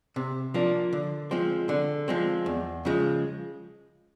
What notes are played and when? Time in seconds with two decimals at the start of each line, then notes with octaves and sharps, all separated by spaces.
0.16 C3
0.54 F3 A#3 D4
0.93 D3
1.31 F3 G#3 C4
1.69 D3
2.08 F3 G#3 C4
2.46 E2
2.85 C#3 F3 G#3